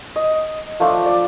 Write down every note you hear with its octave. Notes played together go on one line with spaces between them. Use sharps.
D#5
F3 A3 D4 C5
D5